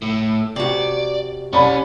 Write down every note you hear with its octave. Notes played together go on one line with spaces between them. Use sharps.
A2
C3 F#4 D5
C2 C#4 D5 B5